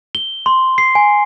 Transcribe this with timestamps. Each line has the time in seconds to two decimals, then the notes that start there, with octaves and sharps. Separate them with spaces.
0.15 G7
0.46 C6
0.78 C7
0.95 G#5